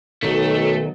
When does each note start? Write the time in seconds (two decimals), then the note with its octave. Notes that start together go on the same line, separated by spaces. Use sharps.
0.23 B1 D#3 F#3 A3